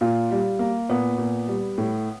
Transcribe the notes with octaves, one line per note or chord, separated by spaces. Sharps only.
A#2 F4
G3
A#3
A#2 B3
A#2
G3
A2